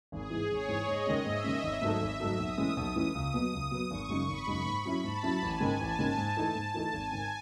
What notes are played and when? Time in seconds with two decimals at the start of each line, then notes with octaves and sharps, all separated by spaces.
0.12 G#1 G#4
0.30 G#2 E3
0.50 G#1 C#5
0.68 G#2 E3
0.87 G#2 D#5
1.07 D#3 G#3 C#4
1.25 G#2 E5
1.44 D#3 G#3 C#4
1.63 G#1 E5
1.82 G#2 F#3 A3 D#4
2.00 G#1 E5
2.19 G#2 F#3 A3 D#4
2.39 B1 D#6
2.58 A2 E3 G#3 C#4
2.76 B1 D#6
2.96 A2 E3 G#3 C#4
3.15 C#2
3.34 B2 F#3 B3
3.52 C#2 D#6
3.71 B2 F#3 B3
3.90 G#1 C#6
4.09 F#2 C#3 G#3 D#4
4.28 G#1 B5
4.47 F#2 C#3 G#3 D#4
4.65 G#2 B5
4.85 F#3 C#4 E4
5.04 G#2 A5
5.23 F#3 C#4 E4
5.42 A1 G#5
5.60 G#2 D#3 G#3 C#4
5.79 A1 A5
5.98 G#2 D#3 G#3 C#4
6.17 G#2
6.37 E3 A3 D#4
6.55 G#2
6.74 E3 A3 D#4
6.93 G#1 G#5
7.12 G#2 D#3